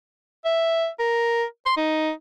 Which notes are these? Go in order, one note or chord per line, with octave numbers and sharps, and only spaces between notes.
E5
A#4
C6
D#4